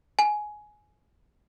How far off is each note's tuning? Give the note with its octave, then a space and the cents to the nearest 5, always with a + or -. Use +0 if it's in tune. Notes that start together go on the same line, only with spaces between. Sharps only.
G#5 +15